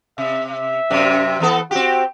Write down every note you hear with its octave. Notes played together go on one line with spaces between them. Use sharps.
C3 E5
E5
F#2 C3
E3 B3 A4
C4 F#4 G4